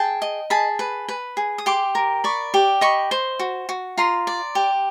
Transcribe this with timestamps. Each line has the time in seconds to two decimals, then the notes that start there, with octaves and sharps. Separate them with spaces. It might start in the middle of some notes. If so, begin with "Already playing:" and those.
Already playing: G#4 G5 A5
0.22 D#5
0.50 G#4 A5 B5
0.79 B4
1.08 B4
1.37 G#4
1.58 D#6
1.66 G4 C6 D6
1.95 A#4
2.24 D5 B5 C#6
2.54 G4
2.81 D#5 B5 C#6
3.11 C5
3.39 F#4
3.69 F#4
3.98 F4 A#5 C6
4.27 D5
4.55 G4